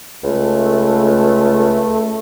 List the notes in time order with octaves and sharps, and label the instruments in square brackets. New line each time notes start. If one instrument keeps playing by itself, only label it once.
[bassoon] C#2 [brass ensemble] A3